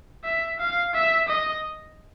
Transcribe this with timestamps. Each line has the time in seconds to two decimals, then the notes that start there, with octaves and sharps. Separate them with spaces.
0.24 E5
0.59 F5
0.94 E5
1.28 D#5